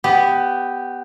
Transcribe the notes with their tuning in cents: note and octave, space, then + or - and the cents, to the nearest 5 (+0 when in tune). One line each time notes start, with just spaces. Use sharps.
B3 +15 G4 +0